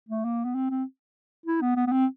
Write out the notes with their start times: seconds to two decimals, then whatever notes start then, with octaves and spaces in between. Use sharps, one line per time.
0.09 A3
0.25 A#3
0.45 B3
0.55 C4
0.70 C4
1.46 E4
1.61 B3
1.76 B3
1.87 B3
1.92 C4